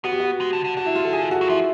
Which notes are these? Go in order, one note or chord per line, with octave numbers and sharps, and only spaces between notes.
B3 F#4
G4
F#4
G#3
D3
D3
D3 F#4
E4
F4
A4
G#4
F#4
F#3
F3 E4